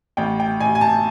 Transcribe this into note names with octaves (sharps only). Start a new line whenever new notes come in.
A1 G5
G5
A1 G#5
G#5
A5